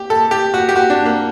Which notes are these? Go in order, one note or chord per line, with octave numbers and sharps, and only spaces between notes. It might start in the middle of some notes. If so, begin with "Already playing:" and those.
Already playing: G4
A4
G4
F#4
G4
F#4
D4
A#3